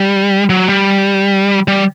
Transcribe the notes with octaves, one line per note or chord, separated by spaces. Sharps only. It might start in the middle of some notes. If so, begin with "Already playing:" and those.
Already playing: G3
F#3
G3
G3